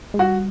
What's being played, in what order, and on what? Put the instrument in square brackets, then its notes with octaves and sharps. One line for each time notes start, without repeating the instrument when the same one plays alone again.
[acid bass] G#3
[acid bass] G3 [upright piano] F#4